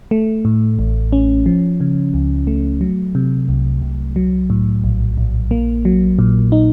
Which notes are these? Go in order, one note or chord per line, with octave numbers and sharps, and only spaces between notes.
A3
A2
A1
C#4
F3
C#3
C#2
A3
F#3
C3
C2
C2
F#3
A2
A#1
A#1
A#3
F#3
A#2
D#4